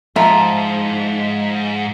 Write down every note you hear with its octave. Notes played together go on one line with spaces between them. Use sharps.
G#2 F3 E5 A#5